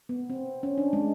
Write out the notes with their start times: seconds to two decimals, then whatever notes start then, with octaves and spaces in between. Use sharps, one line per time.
0.09 B3
0.30 C4
0.63 C#4
0.78 D4
0.93 G#3